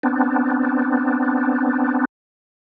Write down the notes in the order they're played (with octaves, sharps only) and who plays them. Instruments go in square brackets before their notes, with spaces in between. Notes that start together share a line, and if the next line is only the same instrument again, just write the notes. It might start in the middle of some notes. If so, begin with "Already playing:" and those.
[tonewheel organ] B3 C4 D4